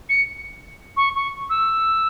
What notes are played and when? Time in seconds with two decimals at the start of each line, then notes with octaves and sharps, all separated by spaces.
0.09 C#7
0.97 C#6
1.16 C#6
1.50 E6